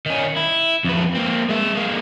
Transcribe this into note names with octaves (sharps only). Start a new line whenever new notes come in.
D#3 C#4
E4
F2 B4
A#3 C4
G#3 E5
G#3 A#3